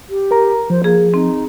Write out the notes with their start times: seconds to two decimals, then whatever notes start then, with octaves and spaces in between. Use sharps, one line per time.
0.10 G4
0.31 A#4 A#5
0.70 F3 C5
0.84 A#3 G#4
1.14 C4 D#4